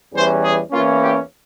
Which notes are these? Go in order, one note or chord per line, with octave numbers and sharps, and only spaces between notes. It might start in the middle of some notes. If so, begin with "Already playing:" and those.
E2 E3 G3 C#4 C5
G#4
E2 E3 A#3 C#4 F4
G4